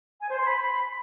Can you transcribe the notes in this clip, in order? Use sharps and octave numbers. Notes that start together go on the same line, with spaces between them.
G#5
C5
C6
B5